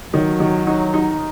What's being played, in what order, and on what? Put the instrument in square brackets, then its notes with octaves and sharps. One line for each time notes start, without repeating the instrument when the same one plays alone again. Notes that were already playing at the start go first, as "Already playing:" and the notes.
[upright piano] D#3 [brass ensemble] F#3
[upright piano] D#3
D#4
D#4